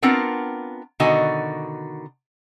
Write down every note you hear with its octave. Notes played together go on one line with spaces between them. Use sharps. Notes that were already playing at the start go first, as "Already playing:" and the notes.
B3 C4 D4 F4 A#4 F#5
B2 D3 D#3 F#4 D#5 G#5